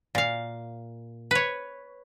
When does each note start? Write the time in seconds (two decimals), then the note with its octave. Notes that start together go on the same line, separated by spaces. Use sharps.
0.15 A#2 F5
1.31 B4 C#5